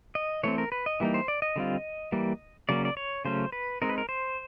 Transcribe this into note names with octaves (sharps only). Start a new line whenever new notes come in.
D#5
E3 A3 C4 C#5
A#4
B4
D#5
E3 G3 A#3 D#4
C5
D5
D#5
D3 G3 C4 F4
E3 G3 A#3
C#3 F#3 A#3 C#4 D5
D5
C#5
C#3 F#3 A3 C#4 C5
B4
G#3 C4 D#4 A#4
B4
A#4
C5